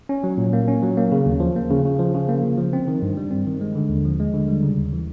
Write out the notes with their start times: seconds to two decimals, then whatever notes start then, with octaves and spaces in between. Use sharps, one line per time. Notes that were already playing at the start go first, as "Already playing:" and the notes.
0.09 C#4
0.24 F#3
0.38 A#2
0.53 A#3
0.68 C#4
0.83 F#3
0.97 A#3
1.12 C#3
1.26 D#2
1.40 F3
1.56 A#3
1.70 C#3
1.85 C#3
1.99 F3
2.14 C#3
2.28 A#3
2.43 C#3
2.57 F3
2.73 C4
2.88 D#3
3.02 G2
3.17 G3
3.31 C4
3.47 D#3
3.61 G#3
3.75 D3
3.89 D#2
4.05 F3
4.20 G#3
4.34 D3
4.48 G3
4.63 C#3
4.78 D#2
4.93 E3